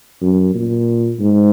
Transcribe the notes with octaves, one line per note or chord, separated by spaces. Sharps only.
F#2
A#2
G#2